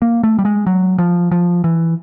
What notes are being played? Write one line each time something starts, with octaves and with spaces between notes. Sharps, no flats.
A#3
A3
G3
G#3
F#3
F3
F3
E3